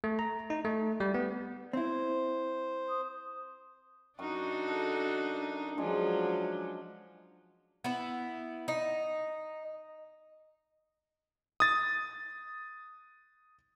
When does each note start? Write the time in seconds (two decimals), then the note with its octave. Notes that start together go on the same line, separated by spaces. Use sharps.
0.04 A3
0.19 A#5
0.50 D#4
0.65 A3
1.00 G3
1.14 B3
1.73 C4 E4 C5
2.89 D#6
4.19 F#2 D4 D#4 F#4
4.68 A4
5.78 F3 F#3 G#3 D4 G#5
7.84 B3 E4
8.68 D#4
11.60 D#6 A6